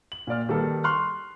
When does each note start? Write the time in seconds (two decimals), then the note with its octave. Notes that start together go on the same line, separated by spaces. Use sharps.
0.12 F#7
0.27 A#2 F4 D5 F6
0.49 D#3 G3 A#3 A4 B4
0.84 C6 C#6 F6 F#6